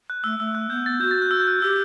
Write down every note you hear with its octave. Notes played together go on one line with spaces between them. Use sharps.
F#6
A3 E6
A3 E6
F#6
B3 G6
A6
F#4 G6
A6
F#6
E6
G6
F#6
G4 E6